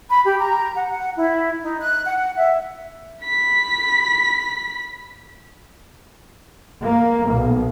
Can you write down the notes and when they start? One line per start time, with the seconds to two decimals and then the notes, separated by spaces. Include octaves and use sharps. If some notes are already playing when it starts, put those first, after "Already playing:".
0.10 B5
0.24 G4
0.38 A#5
0.76 F#5
0.90 F#5
1.18 E4
1.61 D#4
1.80 F#6
2.06 F#5
2.36 E5
3.24 B5 B6
6.82 A#3
7.32 B1